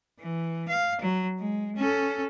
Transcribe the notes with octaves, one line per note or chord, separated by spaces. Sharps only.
E3
F5
F#3
G#3
C#4 A4